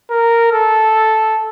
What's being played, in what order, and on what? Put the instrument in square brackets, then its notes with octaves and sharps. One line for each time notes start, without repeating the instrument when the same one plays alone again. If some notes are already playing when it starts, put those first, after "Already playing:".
[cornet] A#4
A4